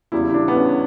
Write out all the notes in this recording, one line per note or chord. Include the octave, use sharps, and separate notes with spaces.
E2 C#3 G3 E4
E4
D4
B3
C#4